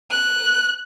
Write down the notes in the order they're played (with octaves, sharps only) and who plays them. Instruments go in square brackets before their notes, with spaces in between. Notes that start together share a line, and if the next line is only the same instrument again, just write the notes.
[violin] F#6